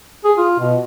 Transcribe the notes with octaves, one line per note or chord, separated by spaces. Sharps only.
G#4
F4
B2